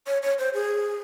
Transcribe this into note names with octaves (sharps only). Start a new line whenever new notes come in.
C#5
C#5
C5
G#4